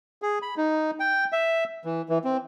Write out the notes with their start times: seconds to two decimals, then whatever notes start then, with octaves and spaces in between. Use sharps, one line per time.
0.22 G#4
0.42 B5
0.57 D#4
1.00 G5
1.32 E5
1.85 E3
2.09 E3
2.24 C4